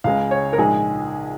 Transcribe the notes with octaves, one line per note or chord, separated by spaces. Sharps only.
C#2 C#3 G#3 F5
C#5
A#4
A#1 G#2 G#3 G#4